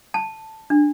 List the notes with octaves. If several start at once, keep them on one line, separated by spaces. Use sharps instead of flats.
A5
D4